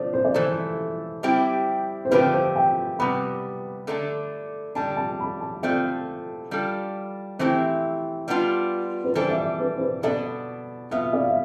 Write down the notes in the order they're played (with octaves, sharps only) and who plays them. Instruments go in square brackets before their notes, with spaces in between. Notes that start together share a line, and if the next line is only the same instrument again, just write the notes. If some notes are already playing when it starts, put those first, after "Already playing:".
Already playing: [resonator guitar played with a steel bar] F3 A3 D4 [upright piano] C5 D5
[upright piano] C5
D5
[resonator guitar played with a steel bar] E3 A3 E4 A4 [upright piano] C5
[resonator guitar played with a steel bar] G3 C4 E4 G4
[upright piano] C5
[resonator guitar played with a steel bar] D3 F3 A3 C4 G4 [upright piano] B4
[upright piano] C5
G5
[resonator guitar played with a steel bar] C3 G3 B3 [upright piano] B5
[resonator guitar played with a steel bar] D3 A3 D4 F4 A4
[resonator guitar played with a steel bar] D3 G3 D4 [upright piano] A5
[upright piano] A5
B5
A5
[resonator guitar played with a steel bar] D3 A3 C4 F4 A4 [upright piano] D5
[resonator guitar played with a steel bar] G3 D4 F4 A4
[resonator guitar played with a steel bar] E3 A3 C4 E4 G4 [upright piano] C5
[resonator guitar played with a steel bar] G3 B3 D4 F4
[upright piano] B4
[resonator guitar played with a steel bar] E3 G3 D4 A4 [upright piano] C5
[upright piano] E5
D5
B4
C5
B4
[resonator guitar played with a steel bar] B2 B3 D4 A4 [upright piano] D5
[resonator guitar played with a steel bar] B2 B3 F4 [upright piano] E5
[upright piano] D5
F5
E5